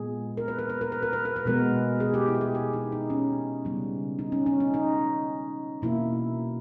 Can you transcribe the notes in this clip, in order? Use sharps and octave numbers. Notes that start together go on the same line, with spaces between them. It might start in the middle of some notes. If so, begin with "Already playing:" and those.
Already playing: A#2 G#3 B3 G#4
A#4
B4
A#4
B4
A#4
B4
A#4
B4
A#4
B4
B2 G#3 B3 A#4
G#4
G4
E4
G4
G#4
G4
D#4
D#4
C#4
C#3 G3 B3
D#4
C#4
C#4
D#4
D#4
B2 A#3 E4